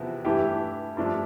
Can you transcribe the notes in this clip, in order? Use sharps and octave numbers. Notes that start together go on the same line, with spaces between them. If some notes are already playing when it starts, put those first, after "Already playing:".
Already playing: E2 C3 F3 B3 E4
G2 E3 A3 E4 G4
G2 F3 A3 D4 G4